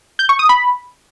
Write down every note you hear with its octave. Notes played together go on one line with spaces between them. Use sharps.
G6
C#6
D#6
B5